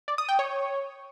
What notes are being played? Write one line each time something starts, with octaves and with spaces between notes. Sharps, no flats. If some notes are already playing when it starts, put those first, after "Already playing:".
D5
D#6
G5
C#5